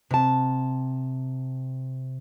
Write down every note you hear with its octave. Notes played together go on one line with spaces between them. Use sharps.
C3 A5